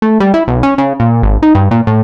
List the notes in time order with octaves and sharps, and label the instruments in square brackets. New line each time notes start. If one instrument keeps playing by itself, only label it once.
[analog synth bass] A3
G3
E4
B1
C#4
C#3
A#2
G#1
D#4
G2
A#2
A2